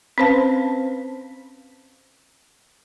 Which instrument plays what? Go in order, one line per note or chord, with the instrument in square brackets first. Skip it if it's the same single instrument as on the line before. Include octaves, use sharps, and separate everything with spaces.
[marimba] C4 C#4 B4 C5 F5 A5